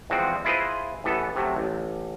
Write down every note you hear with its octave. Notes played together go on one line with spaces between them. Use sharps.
E2 F3 G#3 C4 F#4
E4 F4 G#4 B4 C5 D#5
A1 E3 B3 A4
C3 F#3 A3
A1